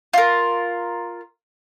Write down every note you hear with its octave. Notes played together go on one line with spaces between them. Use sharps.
F4 A#4